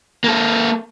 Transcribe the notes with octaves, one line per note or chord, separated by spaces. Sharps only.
A#3 A4